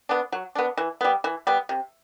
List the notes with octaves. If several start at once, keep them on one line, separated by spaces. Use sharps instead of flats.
B3 D4
F#3
B3 D4
E3
G3 B3
E3
G3 B3
C3